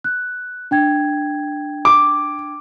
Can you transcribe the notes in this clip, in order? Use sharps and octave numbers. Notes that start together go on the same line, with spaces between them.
F#6
D4 G5 G#6
D6